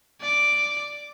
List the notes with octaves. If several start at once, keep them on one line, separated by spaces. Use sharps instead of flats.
D5 D6